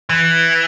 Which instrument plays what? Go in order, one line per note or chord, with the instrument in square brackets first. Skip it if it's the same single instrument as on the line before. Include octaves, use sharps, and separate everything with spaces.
[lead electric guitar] E3